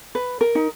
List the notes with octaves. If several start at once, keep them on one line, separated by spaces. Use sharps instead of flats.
B4
A#4
D#4